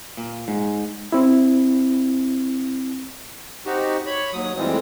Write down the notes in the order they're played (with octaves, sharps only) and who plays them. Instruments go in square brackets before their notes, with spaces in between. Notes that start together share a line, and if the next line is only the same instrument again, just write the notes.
[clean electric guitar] A#2
G#2
[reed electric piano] C4 E4
[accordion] C4 D#4 F#4 G4
C#5 B5
D#2 F#3 D#6
F2 A2 E3 G3 G#3 C4